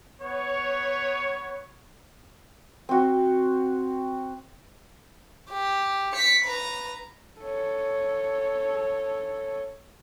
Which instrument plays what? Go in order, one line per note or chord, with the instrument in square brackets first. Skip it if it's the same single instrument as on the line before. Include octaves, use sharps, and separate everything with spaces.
[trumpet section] B3 C#5
[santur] C4 F#4
[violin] G4
B6 C#7
B4 A#5
[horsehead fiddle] A4 C#5